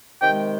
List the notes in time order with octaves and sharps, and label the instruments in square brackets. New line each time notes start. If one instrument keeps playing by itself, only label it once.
[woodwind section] C3 D#3 G#3 G5